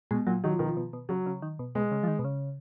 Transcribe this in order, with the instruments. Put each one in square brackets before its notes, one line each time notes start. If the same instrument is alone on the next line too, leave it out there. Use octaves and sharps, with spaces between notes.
[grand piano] B2 [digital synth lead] G#3
[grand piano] A#2 [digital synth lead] F#3
[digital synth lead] D#3 [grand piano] F#3
[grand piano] F3
[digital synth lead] B2 [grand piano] D#3
[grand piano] F3
[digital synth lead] B2
B2
[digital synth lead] C#3 [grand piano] F#3
[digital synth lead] C#3
D#3
B2
[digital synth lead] B2 [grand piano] G#3
[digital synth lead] C#3
F3
D#3
B2
C#3